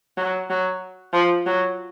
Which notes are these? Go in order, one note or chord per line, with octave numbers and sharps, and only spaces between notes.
F#3
F#3
F3
F#3